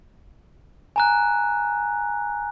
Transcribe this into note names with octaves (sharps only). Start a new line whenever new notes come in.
G#5 A#5 F#6